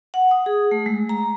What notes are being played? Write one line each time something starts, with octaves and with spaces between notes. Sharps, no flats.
F#5
D#6
G#4
A3
G#3
A#5